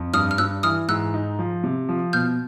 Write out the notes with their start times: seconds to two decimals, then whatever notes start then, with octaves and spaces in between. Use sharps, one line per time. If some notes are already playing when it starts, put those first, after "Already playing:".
Already playing: F2
0.13 G2 D#6 F6
0.31 F6
0.38 G2 E6 F#6
0.63 E3 D#6 F6
0.89 G#2 E6 F#6
1.14 D#4
1.39 F3
1.64 C3
1.89 F3
2.13 B2 F6 G6